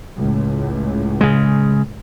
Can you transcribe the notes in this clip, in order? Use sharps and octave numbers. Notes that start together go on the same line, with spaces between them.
C#2 A2
C#3 G#3